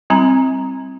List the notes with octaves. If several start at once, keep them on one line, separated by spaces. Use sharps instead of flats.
G3 C4 E4 G#5 A#5